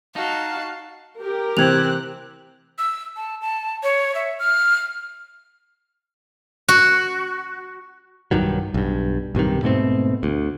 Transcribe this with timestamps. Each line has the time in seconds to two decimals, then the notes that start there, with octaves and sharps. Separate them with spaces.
0.16 D#4 F#4 F5 A5
1.20 G4 A#4
1.57 C3 E3 C4 F#6 G#6 F7
2.79 E6
3.16 A5
3.42 A5
3.83 C#5
4.15 E5
4.39 F6
6.68 F#4
8.31 B1 G2 D#3 F#3
8.74 B1 G2
9.35 B1 G2 C3 D#3
9.63 G#2 B2 A3 C4
10.23 D2